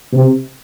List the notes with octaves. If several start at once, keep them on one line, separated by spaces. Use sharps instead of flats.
C3